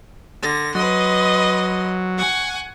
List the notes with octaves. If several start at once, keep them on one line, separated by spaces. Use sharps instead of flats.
D3 A#6
F#3 B4 D#5 C6
F#5 G#5 C#6